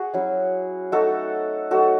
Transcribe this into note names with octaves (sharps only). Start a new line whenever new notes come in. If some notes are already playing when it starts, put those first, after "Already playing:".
Already playing: F#4 G#4
F#3 C#4 E4
A3 D#4 F#4 A4
F#3 A3 D#4 F#4 A4